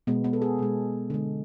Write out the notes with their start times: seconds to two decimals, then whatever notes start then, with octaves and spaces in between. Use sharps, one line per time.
0.07 B2 G#3 B3
0.24 B3
0.33 A4
0.42 G#4
0.59 B2 G#3
1.10 D3 G#3